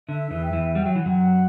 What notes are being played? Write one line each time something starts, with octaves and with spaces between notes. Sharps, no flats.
D3 E5
E2 E3
G5
E2 E3
G3 F#5
F#3
E3
F#2 F#3 F#5